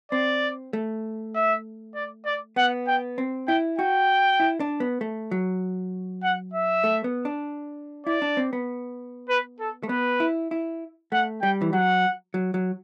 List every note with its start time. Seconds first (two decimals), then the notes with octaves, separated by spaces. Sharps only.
0.12 C4 D5
0.73 A3
1.35 E5
1.95 D5
2.25 D5
2.56 B3 F#5
2.87 G5
3.18 C4
3.48 E4 G5
3.78 F#4 G5
4.40 E4
4.60 D4
4.80 B3
5.01 A3
5.31 F#3
6.23 F#5
6.53 E5
6.84 A3
7.04 B3
7.25 D4
8.06 E4 D5
8.22 D4
8.37 C4
8.53 B3
9.29 B4
9.60 A4
9.83 A3
9.89 B3 B4
10.20 E4
10.51 E4
11.12 A3 F#5
11.42 G3 G5
11.62 E3
11.73 F#3 F#5
12.34 F#3
12.54 F#3